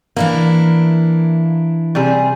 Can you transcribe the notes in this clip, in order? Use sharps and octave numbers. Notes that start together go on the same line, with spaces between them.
E3 A#3 D4 E4
C3 G3 G#4